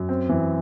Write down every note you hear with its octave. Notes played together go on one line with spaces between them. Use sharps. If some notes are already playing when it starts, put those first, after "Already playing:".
Already playing: F#2
C4
E3